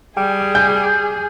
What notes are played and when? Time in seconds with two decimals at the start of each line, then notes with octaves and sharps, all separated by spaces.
0.17 G3 G#4 G5
0.55 G#5 G6